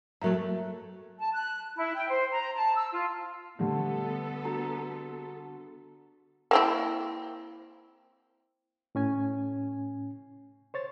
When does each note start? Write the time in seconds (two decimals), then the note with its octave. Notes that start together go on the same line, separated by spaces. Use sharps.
0.22 A2 F#3 A3 A#4 E5 A#5
0.34 A3
1.18 A5
1.34 F#6
1.77 E4
1.95 G5
2.09 C5
2.31 A#5
2.56 A5
2.74 E6
2.92 F4
3.59 D3 G3 A3 B3 A4
4.45 D4 F#4 A#5
6.51 A#3 C4 E4
8.95 A2 C#4 G#5
10.74 C5 C#5 A6